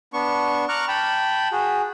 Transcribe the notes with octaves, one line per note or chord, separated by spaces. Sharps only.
B3 D4 C#6
A#5 C#6 D6 F6 F#6
G5 A5 B5
F#4 G#4